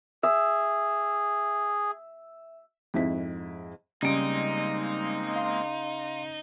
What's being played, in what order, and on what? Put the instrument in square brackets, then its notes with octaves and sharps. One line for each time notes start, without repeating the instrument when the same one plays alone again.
[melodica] G#4 [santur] E5
[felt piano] F2 G#2 E4 B6
[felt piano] C#3 D7 [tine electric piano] G3 [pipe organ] G#3 A#3 C4 [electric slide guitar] D#4
[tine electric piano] F5 C6